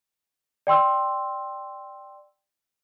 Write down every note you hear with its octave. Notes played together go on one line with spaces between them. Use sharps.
D5 G5 C6 E6